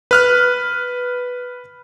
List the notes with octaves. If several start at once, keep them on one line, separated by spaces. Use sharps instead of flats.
B4 F6 F#6